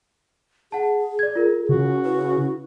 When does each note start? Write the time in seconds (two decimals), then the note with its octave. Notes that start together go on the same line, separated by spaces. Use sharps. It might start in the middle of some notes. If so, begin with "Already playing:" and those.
0.72 G#4 F#5 A5
1.19 D5 G#6
1.35 F4 A#4
1.69 C#3 F#4
2.05 E4 B4